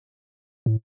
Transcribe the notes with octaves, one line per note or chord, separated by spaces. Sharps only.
A2